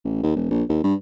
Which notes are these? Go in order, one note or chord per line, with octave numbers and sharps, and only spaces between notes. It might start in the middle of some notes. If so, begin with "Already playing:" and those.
A1
D#2
E1
A#1
D#2
G2